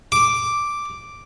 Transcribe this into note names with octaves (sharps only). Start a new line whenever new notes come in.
D6